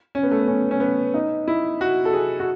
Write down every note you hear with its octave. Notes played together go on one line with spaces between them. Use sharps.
C#4
B3
A3
B3
C#4
C#4
B3
D#4
E4
F#4
A4
G#4
F#4